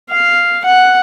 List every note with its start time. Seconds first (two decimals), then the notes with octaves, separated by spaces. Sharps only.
0.10 F5
0.65 F#5